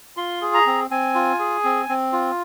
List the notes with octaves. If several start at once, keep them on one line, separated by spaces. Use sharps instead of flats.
F4 C6
G#4
A#5
C4
C4 G#5
F4
G#4
C4
C4
F4